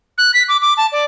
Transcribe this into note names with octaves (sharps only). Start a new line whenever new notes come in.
F#6
B6
D6
D6
A5
D5